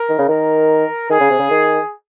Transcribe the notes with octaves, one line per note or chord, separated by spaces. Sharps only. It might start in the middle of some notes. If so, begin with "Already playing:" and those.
Already playing: A#4
D#3
C#3
D#3 A#4
D#3 G#4
C#3
C3
C#3
D#3